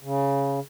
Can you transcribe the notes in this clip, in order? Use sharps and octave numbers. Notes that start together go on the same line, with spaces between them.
C#3